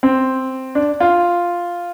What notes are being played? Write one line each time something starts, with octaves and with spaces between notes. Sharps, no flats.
C4
D4
F4